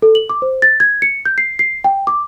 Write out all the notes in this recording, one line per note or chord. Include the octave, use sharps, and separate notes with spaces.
A4
F#7
D6
C5
A6
G#6
C#7
G6
C7
C7
G5
D6